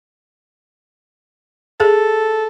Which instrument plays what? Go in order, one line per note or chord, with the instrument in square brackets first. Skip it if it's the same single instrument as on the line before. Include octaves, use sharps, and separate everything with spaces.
[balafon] G#4 [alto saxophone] A4